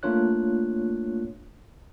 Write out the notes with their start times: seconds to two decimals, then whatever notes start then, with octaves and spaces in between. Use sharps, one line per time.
0.03 A3 A#3 D4 F4 C#5 F#6